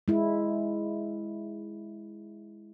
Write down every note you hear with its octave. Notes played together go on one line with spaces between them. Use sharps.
G#3 E4